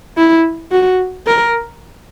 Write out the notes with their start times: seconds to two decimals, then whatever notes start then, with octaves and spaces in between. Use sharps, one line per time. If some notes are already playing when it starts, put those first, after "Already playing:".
0.17 E4
0.71 F#4
1.27 A#4